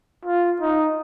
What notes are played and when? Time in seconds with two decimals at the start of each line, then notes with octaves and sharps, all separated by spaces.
0.25 F4
0.61 D#4